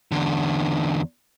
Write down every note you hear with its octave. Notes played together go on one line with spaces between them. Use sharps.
E2 D3